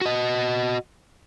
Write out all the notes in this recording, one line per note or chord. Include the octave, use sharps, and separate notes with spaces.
F#4 D#5